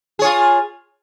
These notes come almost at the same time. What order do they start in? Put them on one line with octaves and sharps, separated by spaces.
G#4 C#5 F4